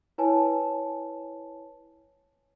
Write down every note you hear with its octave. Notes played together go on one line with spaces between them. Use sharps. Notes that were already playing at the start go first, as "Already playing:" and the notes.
E4 B4 C#5 G#5 A5